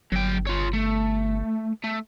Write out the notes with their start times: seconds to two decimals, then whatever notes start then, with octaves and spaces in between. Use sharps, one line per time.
0.12 G1 F#3 G5
0.47 F4 C#5
0.73 A3
1.84 A3